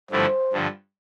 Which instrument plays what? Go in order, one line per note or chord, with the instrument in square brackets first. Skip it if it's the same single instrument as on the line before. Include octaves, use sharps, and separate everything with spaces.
[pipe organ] G2 D3 F3 A3 E4 [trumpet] C5
[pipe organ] G2 D3 F3